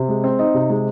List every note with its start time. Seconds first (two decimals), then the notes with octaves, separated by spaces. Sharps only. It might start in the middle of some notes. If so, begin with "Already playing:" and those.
Already playing: C3
0.09 G#3
0.24 C4
0.39 D#4
0.54 C3
0.70 G#3